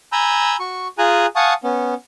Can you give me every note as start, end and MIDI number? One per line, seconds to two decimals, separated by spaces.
0.12 0.57 80
0.12 0.57 82
0.12 0.57 83
0.12 0.57 88
0.12 0.57 91
0.60 0.88 66
0.60 0.88 85
0.98 1.26 65
0.98 1.26 68
0.98 1.26 80
0.98 1.26 82
0.98 1.26 90
1.36 1.54 77
1.36 1.54 78
1.36 1.54 80
1.36 1.54 81
1.36 1.54 85
1.36 1.54 87
1.64 1.94 59
1.64 1.94 61